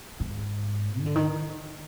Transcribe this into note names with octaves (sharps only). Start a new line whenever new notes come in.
G#2
D#3
D3
D#3